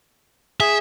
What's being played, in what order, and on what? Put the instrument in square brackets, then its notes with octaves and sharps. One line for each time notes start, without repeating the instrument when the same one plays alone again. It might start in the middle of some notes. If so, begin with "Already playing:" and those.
[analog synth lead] G#4 [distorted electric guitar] E5